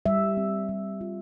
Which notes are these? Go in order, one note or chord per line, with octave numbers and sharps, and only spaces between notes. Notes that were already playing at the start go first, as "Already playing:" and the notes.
G3 E5
C4
G3
F4